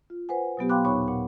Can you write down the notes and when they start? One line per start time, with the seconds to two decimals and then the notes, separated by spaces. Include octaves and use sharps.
0.10 F4
0.29 B4 C5 F#5 G#5
0.57 B2 F#3 B3 G4
0.69 F5 G5 B5 C6 D6 F#6
0.85 D#2 A#2 D#4 C#5 B5 C#6
1.08 A#2 F#5